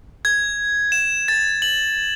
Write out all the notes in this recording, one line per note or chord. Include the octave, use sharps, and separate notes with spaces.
G#6
E7
A6
F#7